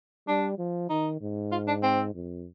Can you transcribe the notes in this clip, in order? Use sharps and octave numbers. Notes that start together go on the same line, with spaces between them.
G3 D4
F3
D#3 D#4
G#2
F4
D4
C4
F2